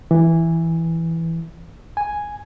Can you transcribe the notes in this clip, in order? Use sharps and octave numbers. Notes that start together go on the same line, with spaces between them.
E3
G#5